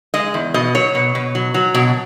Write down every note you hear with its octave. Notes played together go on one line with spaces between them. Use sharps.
G#3 D#5
E2
B2 D#5
F#3 C#5
B2
B2
F#3
F#3
B2